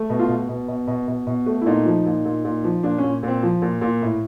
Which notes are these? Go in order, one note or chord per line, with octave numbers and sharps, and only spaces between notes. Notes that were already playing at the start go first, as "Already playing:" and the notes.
Already playing: A3
B2
F4
B2
B2
B2
B2
B2
B2
A3
E4
A#2 D#4
F3
A#2
A#2
A#2
F3
A#2 D4
C#4
A#2
A#2 C4
F3
A#2
A#2
A2